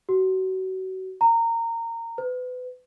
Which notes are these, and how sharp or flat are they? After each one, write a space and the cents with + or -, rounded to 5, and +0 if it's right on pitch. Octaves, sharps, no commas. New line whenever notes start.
F#4 +30
A#5 -20
B4 +30